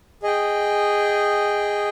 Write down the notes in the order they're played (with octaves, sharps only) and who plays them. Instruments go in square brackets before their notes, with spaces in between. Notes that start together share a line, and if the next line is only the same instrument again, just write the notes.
[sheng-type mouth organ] G#4 D#5 G5